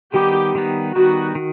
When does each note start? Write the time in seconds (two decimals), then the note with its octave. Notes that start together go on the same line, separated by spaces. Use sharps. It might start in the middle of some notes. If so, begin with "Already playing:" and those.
0.14 D#3 G3 B3 D#4 G4
0.55 D#3 G3 B3 D#4
0.95 D#3 G3 B3 D#4 F#4
1.35 D#3